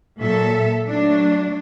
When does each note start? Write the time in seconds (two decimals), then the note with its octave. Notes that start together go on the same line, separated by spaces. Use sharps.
0.21 A#2 F#3 A4 E5
0.90 F#3 A3 D4